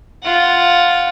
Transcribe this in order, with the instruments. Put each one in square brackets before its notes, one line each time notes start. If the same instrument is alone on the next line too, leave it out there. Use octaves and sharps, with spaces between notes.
[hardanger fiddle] F4 F#5